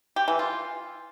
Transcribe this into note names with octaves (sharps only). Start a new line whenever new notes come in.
G4
E3
F4